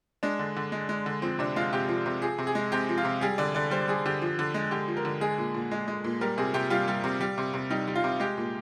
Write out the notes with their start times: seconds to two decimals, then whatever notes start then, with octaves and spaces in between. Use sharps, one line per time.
0.23 G#3 D4
0.39 D3
0.56 D3
0.72 G#3
0.89 G#3
1.06 D3
1.22 F3 C4
1.39 C3 D4
1.56 G#3 F4
1.73 C3 G4
1.89 F3
2.06 C3
2.22 F3 G#4
2.38 C3
2.47 G#4
2.55 G#3
2.72 C3 G4
2.89 F3
2.98 F4
3.05 C3
3.21 G3 G#4
3.38 D3 D5
3.55 D3 D5
3.71 G3 C5
3.88 G3 G#4
4.06 D3 G4
4.22 F3
4.39 D3
4.54 G#3
4.71 D3 G4
4.88 F3
4.97 A#4
5.05 D3
5.21 G#3 G#4
5.38 A#2
5.54 A#2
5.71 G#3
5.88 G#3
6.04 A#2
6.21 G3 A#4
6.38 C3 G#4
6.54 C3 G4
6.70 G3 F4
6.88 G3
7.04 C3
7.21 G3
7.38 C3
7.54 C3
7.70 G3 D#4
7.88 G3
7.95 F4
8.04 C3
8.20 G#3 G4
8.38 A#2